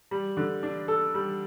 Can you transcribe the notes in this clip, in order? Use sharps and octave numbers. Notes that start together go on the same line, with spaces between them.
G3
D3
D4
A4
G3